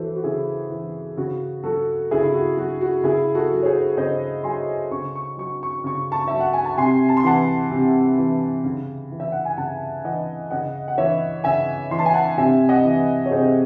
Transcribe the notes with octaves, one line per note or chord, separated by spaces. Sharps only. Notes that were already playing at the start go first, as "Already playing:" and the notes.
Already playing: E3 F#4 A4 C5
F#4
C#3 E4 G#4
E3
C#3 F#4
F#3 F#4 A4
C#3 E4 G#4
E4
F#4
F#3 F#4
F#4
C#3 E4 G#4
F#4 A4
F#3
C#5
G#4 C5
C#3 C5 D#5
F#3 G#5 C6
C#3 C#6
C#6
F#3 C#6
C#6
C#3 C#6
A5 C#6
F#3 E5
F#5
G#5
A5
C3 G#5 C6
A5
C6
E3 F#5 A5
C3
E3
C#3
E3
E5
F#5
G#5
C#3 F#5 A5
E3 D#5 F#5
C#3 D#5 F#5
F#5
E3 C#5 E5
C#3 E5 G#5
E3 C6
A5
G#5
F#5 A5
C3 E5 G#5
D#5 F#5
E3
C#5
C3 G#4 C5